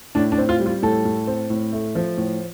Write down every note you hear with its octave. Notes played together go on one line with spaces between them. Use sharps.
A2 D4
D4
C4
F4
G3
F4
A2 A4
A2
C4
A2
A3
F3
A2